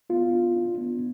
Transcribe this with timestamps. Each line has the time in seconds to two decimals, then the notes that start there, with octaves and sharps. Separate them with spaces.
0.10 B3 F4
0.33 D4
0.55 D4
0.78 B3